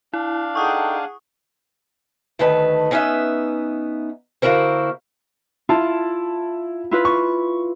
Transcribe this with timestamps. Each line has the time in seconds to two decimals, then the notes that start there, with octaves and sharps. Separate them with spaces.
0.13 D4 E4 F5
0.55 D#4 G#4 A4 F#5 G5 C#6 D#6
2.39 D2 D#3 A3 B4 A5
2.91 B3 C#4 D#4 B4 E5
4.42 D3 A#3 E4 F#4 A#4 C5
5.69 E4 F4 A5
6.91 E4 F4 B4
7.05 C#6